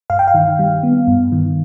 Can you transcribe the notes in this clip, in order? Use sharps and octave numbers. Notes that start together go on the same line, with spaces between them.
G2 F5
G5
F5
D#3
G3
B3
G2
D#3